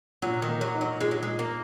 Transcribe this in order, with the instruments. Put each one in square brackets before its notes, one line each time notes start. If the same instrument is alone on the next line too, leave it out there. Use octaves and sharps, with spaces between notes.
[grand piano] A#2 [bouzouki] F#3
[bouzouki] D#3
[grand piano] A#3
[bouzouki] F#3
[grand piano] D#4
[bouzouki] F#3
[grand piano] A#2 [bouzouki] G#3
[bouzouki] F#3
[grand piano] A#2 [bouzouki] G#3
[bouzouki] A#3